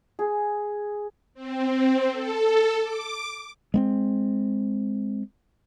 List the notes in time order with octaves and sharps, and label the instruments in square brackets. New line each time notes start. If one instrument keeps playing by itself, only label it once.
[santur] G#4
[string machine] C4
A4
D6
[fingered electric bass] G#3 B3 C4